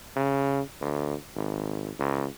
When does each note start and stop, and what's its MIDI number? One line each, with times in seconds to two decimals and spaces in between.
0.16 0.61 49
0.81 1.15 38
1.36 1.91 32
1.99 2.26 37